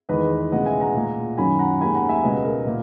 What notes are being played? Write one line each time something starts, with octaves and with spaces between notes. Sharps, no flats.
E2 D#3 G#3 B4 D#5
C#2 B2 G#3 D#5 F#5
E5 G#5
F#5 A#5
A#2 G#3
F#2 D#3 F#3 G#5 B5
F#5 A#5
D#2 D#3 G#3 G#5 B5
F#5 A#5
E5 G#5
C#2 B2 G#3 D#5 F#5
A#4
A#2